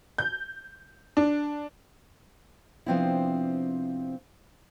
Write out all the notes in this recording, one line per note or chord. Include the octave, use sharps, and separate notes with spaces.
G6
D4
C3 F3 B3 C4 D4 E4